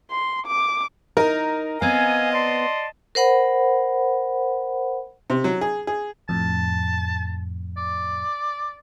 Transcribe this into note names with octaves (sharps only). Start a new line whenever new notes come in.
C6
D6
D#4 A#4
B3 C4 D#5 F5 G#5
D5 A5 C6
A#4 C5 F#5 B5
C3
F#3
G#4
G#4
F2 A2 A5
D5